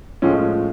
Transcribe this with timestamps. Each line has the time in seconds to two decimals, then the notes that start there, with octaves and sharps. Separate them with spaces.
0.22 A2 F3 G#3 C#4